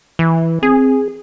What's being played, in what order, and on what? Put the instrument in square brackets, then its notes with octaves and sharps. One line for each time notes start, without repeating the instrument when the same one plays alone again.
[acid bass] E3
[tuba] C4 [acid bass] G#4